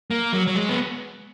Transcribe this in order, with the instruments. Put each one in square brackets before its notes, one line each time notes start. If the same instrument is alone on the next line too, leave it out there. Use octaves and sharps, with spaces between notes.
[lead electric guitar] A#3
F#3
F#3
G#3
B3